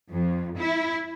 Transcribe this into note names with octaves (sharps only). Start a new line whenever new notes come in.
F2
E4